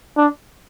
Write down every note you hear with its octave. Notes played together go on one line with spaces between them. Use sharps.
D4